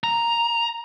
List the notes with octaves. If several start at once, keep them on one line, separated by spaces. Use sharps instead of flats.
A#5